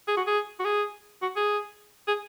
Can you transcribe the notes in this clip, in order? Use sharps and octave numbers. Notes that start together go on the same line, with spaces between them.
G#4
F#4
G#4
F#4
G#4
F#4
G#4
G#4